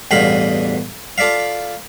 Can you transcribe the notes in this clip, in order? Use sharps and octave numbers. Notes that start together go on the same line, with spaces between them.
A1 E2 G2 B2 F5 B5
F4 A4 D5 E5 F5